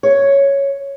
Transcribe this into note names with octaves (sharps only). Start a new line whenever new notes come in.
C#5